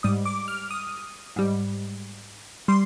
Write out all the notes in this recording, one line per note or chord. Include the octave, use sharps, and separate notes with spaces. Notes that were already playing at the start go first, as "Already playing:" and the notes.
G#2 G3 D#6
D6
F6
D#6
G#2 G3
G3 C6